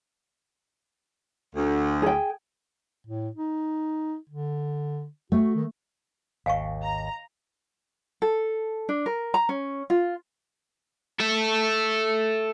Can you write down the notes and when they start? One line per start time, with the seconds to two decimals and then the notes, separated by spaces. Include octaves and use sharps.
1.55 D2
2.02 G#4 G5
3.07 A2
3.36 D#4
4.30 D3
5.32 A3 F#4
5.55 D#3
6.46 G#1 D#2 F5 G#5 C#6
6.83 A#5
8.22 A4
8.89 D4
9.06 A#4
9.34 A#5
9.49 C#4
9.90 F4
11.20 A4 E5